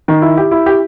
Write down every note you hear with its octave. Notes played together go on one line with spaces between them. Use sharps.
D#3
E4
G4
E4
G4